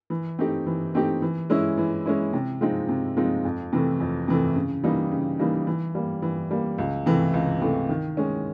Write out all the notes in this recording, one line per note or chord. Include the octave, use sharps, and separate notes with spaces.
E3
A3 C4 D#4 G4
E3
A3 C4 D#4 G4
E3
G#3 C#4 E4
E3
G#3 C#4 E4
C3
F3 G#3 C4 D#4
C3
F3 G#3 C4 D#4
F2
C3 E3 A3
F2
C3 E3 A3
C#3
E3 G3 A#3 D#4
C#3
E3 G3 A#3 D#4
E3
G3 A#3
E3
G3 A#3
C#2
C3 E3 A3
C#2
C3 E3 A3
D#3
G#3 C#4